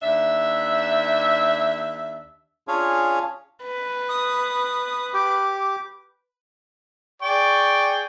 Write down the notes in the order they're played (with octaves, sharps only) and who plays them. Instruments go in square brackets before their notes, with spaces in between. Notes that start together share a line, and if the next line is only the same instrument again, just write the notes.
[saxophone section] D#2 D4 E5
[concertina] C#4 D4 F4 G#4 C#5 F5
[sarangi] B4
[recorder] D#6
[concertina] G4 [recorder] D6
[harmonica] G#4 D5 G5 [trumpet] C#6